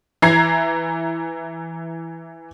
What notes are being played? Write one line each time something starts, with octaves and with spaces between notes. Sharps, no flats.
E3 A#5 G#6 C7